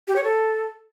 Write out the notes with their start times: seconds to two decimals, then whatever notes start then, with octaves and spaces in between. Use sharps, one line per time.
0.08 G4
0.16 C#5
0.24 A4